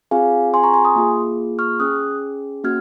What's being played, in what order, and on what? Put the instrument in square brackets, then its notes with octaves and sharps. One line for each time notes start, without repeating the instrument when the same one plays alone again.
[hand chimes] C4 F4 G#4 F5 G#5
G#5 C6
A#5 C#6
G#5 C6
C6 D#6
A#3 F4 G#4
C#6 F6
C#4 G#4 D#6 F#6
A#3 C#4 F#4 F6 G#6